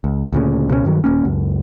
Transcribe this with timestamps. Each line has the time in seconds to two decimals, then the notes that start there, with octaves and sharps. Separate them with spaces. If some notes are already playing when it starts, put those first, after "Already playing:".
0.04 C#2
0.33 D2 A#2 C#3
0.70 C#2 B2 A3 C#4
0.85 G2 D#3 F#3
1.04 D#1 A#3 C#4
1.25 C#2 F#2